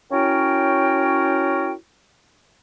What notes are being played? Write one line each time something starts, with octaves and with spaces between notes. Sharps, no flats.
C#4 E4 F#4 A#4 C#5 G5